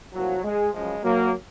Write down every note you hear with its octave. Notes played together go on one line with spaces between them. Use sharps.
C2 A#2 F3 F#3
G#3
F#2 C#3 F3 G#3
F#3 A#3